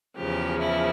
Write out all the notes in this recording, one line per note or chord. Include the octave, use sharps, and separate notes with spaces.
E2 C#3 F3 G4
E4